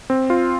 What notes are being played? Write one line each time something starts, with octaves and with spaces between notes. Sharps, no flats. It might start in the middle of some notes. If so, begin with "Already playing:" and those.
C4
F4